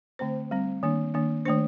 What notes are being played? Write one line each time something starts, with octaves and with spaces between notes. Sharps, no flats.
D3 A3 C4 C5
G3 C4
D#3 A#3 D4
D#3 A#3 D4
D#3 A3 D4 C5